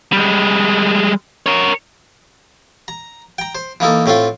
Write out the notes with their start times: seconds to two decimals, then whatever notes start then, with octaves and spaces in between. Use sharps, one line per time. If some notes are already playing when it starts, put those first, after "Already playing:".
0.12 G3 G#3
1.46 A#4 C#5
2.88 A#5
3.38 G5 A#5
3.55 C5
3.80 E3 A#3 D#4 A4
4.06 A2 A3 C4 F4